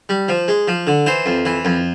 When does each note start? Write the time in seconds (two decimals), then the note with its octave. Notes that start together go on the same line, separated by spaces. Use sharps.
0.09 G3
0.28 F3
0.48 G#3
0.68 F3
0.87 D3
1.06 E3 C5
1.26 F2
1.45 E3
1.65 F2